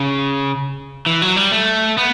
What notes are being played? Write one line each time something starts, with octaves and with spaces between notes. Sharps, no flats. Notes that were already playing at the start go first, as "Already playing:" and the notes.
Already playing: C#3
E3
F#3
G3
A3
B3